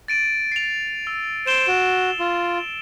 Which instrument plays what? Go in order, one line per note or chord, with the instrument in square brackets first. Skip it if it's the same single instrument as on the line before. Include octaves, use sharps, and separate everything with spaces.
[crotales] A6 D7 D#7
C7 F7
E6
[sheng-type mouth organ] C5 [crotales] D7 E7 G7
[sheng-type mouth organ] F#4
F4